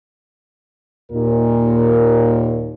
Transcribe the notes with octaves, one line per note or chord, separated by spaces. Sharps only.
D#2 A#2 A#4